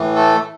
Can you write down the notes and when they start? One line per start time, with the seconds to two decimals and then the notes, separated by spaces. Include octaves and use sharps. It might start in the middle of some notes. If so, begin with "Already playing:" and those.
Already playing: A2 E3
0.16 A3 A4